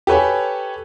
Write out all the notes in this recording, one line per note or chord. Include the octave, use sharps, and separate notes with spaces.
G4 A4 B4 C#5 G#5